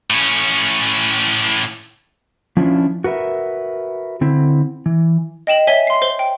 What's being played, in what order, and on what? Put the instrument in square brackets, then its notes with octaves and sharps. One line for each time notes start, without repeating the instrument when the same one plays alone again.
[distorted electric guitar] A2 C#4
[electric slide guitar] F3 C#4 D4 E4 F4
F#4 A#4 B4 E5
D3 C4 E4
E3
[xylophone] D#5 G5 E7 F#7
C#5 E5 G#5 B6 G7
C6 C7
C5 G7
G5